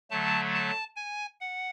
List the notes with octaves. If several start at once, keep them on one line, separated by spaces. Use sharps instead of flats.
D3 F#3 A3 A5
A5
G#5
F#5